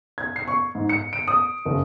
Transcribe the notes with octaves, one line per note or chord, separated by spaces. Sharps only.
G#6
C7
C#6
G#2
C#7
D7
D#6
F#1